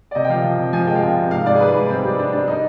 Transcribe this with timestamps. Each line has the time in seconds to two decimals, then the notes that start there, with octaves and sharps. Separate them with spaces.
0.11 D5
0.15 C3 D#5
0.25 G5
0.29 F3 F5
0.44 F3
0.59 C3
0.73 F3 G#5
0.87 G#3 G5
0.95 F5
1.02 C3 G5
1.17 C3
1.31 G#2 F5
1.46 G#2 D5
1.54 G#4
1.60 G3 B4
1.75 G#2
1.90 G3 C4
2.04 G3
2.18 G3 D4
2.33 G3 D4
2.48 D#4